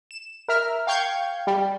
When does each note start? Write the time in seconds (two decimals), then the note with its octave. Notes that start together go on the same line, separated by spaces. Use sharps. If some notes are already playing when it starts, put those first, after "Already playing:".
0.11 E7
0.48 A#4 E5 F6
0.87 F5 G5 C#6 G6 G#6
1.47 G3